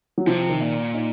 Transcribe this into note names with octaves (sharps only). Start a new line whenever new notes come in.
F#3
C3 F3
D#3
A#2
D#4